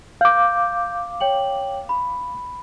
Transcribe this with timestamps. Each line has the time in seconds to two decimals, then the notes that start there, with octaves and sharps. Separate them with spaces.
0.21 F5 D6 G6
1.20 C#5 G5 F#7
1.89 B5